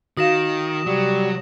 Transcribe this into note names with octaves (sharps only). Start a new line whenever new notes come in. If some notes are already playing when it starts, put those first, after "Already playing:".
D#3 F#4 F5 D#6 A#6 E7
C3 F#3 G3